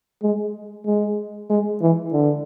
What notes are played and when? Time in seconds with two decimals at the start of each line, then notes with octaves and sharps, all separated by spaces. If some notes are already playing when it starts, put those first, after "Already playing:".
0.22 G#3
0.86 G#3
1.50 G#3
1.81 E3
2.13 D3